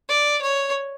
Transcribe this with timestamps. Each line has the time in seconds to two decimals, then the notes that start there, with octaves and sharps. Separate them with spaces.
0.09 D5
0.42 C#5